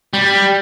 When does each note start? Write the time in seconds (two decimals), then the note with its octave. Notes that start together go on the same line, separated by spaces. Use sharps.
0.13 G3